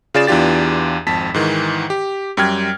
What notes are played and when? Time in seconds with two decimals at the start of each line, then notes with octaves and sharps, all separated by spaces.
0.14 C#3 F4 G#4 D5 A6 E7
0.27 E2 E3 D4 F4 G4 A6
1.07 G#1 F2 A5 B6
1.34 G#2 D#3 E3
1.90 G4
2.37 F#2 G3 G5 F6 G#6